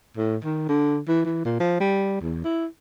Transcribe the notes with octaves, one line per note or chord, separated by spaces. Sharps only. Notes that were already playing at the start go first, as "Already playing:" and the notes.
A2
D#3
D3
E3
E3
A#2
F3
G3
E2
E4